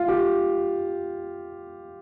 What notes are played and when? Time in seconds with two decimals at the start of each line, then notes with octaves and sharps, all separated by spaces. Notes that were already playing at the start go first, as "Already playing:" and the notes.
Already playing: F4
0.08 G4